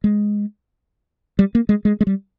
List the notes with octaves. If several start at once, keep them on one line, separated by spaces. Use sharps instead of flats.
G#3
G3
A#3
G#3
G#3
G#3
G3